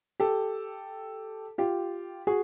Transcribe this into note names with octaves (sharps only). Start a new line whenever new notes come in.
G4 A4
F4 G4
F#4 G#4